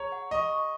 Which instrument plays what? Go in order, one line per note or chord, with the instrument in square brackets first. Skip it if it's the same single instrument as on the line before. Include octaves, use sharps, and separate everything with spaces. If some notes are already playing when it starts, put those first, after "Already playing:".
Already playing: [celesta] G#4 A#5 [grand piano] C#5
[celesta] F#5
[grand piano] D#5 [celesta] C#6
[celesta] C#6